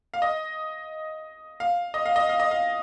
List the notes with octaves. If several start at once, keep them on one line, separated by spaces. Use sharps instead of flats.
F5
D#5
F5
D#5
F5
D#5
F5
D#5
F5